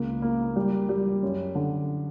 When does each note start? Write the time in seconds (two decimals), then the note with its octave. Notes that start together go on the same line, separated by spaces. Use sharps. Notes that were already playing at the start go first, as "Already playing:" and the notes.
Already playing: C#2 A#3
0.22 A#3
0.56 G3
0.89 G3
1.22 F#2
1.55 D3